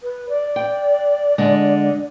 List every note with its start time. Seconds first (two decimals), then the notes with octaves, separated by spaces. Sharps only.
0.02 B4
0.29 D5
0.56 G5
1.38 D3 G#3